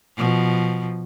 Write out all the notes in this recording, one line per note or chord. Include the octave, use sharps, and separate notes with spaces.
B2 F3